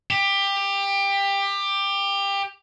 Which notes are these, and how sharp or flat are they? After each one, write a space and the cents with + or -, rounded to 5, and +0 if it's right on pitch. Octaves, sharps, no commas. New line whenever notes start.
G4 +20